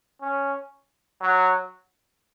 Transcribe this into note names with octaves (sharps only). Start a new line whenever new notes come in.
C#4
F#3